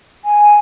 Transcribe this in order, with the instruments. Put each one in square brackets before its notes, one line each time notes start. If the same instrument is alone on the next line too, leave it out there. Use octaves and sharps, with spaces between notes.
[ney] G#5